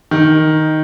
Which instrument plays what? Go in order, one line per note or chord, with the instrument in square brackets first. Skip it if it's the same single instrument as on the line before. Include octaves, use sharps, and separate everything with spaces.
[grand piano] D#3